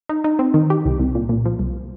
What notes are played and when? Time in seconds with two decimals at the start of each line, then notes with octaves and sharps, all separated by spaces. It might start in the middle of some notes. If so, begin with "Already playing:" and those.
0.09 D#4
0.24 D#4
0.39 C4
0.54 D#3
0.70 G4
0.85 C2
1.00 C2
1.15 A#2
1.29 A#2
1.45 F3
1.59 C2